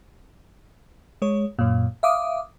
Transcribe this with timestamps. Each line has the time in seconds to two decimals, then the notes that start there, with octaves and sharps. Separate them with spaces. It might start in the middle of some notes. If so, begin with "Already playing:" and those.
1.22 G#3 C#5
1.59 F#2 A#2
2.03 E5 F5 D6 D#6